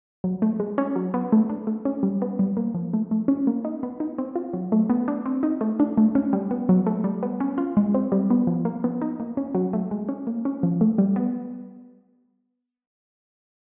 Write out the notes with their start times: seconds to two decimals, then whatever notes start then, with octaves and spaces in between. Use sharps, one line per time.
0.24 F#3
0.42 A3
0.60 G#3
0.78 C#4
0.96 F#3
1.14 B3
1.32 A3
1.49 D4
1.67 A3
1.85 C#4
2.03 G3
2.22 B3
2.39 G3
2.57 A#3
2.74 F3
2.93 A3
3.11 A3
3.28 C#4
3.47 A#3
3.65 D#4
3.83 B3
4.00 D#4
4.18 C4
4.36 F4
4.53 F#3
4.72 A3
4.90 B3
5.08 D4
5.26 C4
5.43 D#4
5.61 A3
5.80 D4
5.98 A3
6.15 C#4
6.33 G3
6.51 B3
6.69 F#3
6.87 A3
7.04 G3
7.23 B3
7.40 C#4
7.58 F4
7.77 G#3
7.94 C4
8.12 G3
8.30 B3
8.47 F3
8.65 A#3
8.84 B3
9.02 D#4
9.20 A#3
9.37 C#4
9.55 F#3
9.73 A3
9.91 G#3
10.09 C#4
10.27 A#3
10.45 C#4
10.63 F3
10.81 A3
10.98 G3
11.16 B3